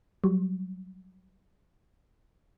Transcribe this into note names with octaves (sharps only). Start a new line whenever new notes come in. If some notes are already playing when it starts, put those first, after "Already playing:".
F#3 G3